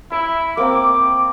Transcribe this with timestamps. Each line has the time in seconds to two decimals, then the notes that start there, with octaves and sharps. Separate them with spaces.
0.12 E4 B5
0.57 A#3 C4 G5 D6